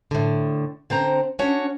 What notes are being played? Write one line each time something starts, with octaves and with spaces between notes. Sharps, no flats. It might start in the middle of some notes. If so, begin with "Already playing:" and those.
A2 D3
D3 C4 C5 A#5
C#4 D4 F#4 C#5